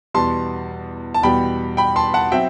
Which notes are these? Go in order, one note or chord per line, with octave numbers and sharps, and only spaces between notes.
E2 B2 G3 B3 A5 C6
A5
E2 B2 G3 G5 B5
G5 B5
A5 C6
F#5 A5
F#3 C4 E5 G5